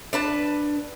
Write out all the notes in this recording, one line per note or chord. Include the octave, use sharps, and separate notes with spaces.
D4 B4 A5